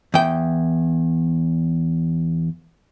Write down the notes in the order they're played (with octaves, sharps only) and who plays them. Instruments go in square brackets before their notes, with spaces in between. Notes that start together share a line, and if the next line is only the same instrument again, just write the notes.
[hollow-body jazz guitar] E2 G5